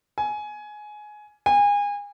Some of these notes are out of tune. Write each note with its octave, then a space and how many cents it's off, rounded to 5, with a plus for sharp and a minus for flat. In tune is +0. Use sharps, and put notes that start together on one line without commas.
G#5 +15
G#5 -30